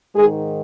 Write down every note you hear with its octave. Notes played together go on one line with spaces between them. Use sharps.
G#2 D#3 G#3 G#4